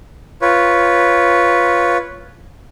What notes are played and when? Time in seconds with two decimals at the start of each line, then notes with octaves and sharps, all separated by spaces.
0.42 F4 B4 C#5